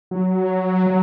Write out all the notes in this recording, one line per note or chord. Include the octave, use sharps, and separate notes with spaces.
F#3
F#3